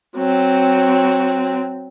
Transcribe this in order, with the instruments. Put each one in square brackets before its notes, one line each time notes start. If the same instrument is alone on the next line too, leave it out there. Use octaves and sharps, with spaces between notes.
[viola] F#3 C4